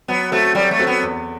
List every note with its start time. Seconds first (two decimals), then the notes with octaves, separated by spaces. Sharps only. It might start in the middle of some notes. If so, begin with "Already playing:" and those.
0.08 F#3 B3
0.32 A3 C4 F#4 A4
0.55 F#3 G3
0.71 A3
0.79 C4 F#4 A4
0.87 B3
1.02 E2